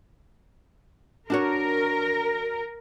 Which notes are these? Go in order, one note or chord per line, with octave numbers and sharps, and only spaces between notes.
D4 F#4 A#4 C#5